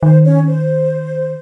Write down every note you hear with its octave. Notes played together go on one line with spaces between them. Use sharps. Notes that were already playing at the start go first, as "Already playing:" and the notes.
D#3 C5
C#4 C#5
C5